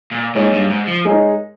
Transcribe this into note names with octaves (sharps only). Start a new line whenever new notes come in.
A#2
G#2 A#3 D#4 G#4 C#5
G2
G#2
F3
G#3 D#4 A#4 C#5